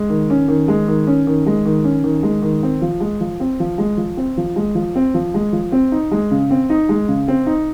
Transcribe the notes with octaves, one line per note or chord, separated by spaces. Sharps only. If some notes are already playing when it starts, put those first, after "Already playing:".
Already playing: G#3
D#3
C#4
D#3
G#3
D#3
C#4
D#3
G#3
D#3
C#4
D#3
G#3
D#3
C4
F3
G#3
F3
C4
F3
G#3
F3
C4
F3
G#3
F3
C4
F3
G#3
F3
C4
D#4
G#3
C#3
C4
D#4
G#3
C#3
C4
D#4